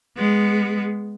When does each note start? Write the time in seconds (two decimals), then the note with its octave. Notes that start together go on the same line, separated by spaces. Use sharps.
0.17 G#3 B3